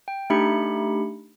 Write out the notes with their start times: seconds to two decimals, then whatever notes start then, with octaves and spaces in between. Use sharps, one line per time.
0.08 G5
0.30 A3 D4 D#4 G4 B5 C#7